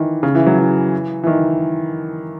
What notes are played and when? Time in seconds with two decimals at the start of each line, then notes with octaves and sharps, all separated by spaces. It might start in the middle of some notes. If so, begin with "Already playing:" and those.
Already playing: D#3 E3
0.23 C#3
0.35 E3
0.46 F#3
0.58 E3
1.23 E3
1.27 D#3